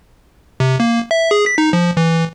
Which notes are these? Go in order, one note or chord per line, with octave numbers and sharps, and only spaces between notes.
C3
A#3
E5
G#4
B6
D#4
F3
E3